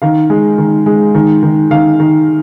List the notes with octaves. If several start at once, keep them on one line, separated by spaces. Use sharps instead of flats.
D#3 F5
G#3
D#3
G#3
D#3
D#3
D#3 F5
D#3